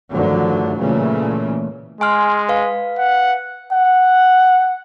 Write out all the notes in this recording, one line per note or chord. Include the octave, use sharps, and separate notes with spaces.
G2 D3 D#3 F3 F#3 A3
A#2 C#3 E3 A3
G#3 G#5 C6 F6
B4 F5
F#5
F#5